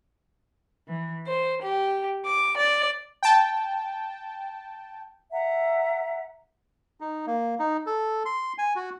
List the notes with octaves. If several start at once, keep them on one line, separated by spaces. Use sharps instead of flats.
E3
C5
G4
D6
D5
G5 A5
E5 F#5 A#5
D#4
A#3
D#4
A4
C6
G#5
F#4